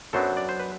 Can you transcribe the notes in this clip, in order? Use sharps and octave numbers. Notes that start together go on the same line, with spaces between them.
F#2 F#3 B3 D4 A4 C5
D5
C5
B4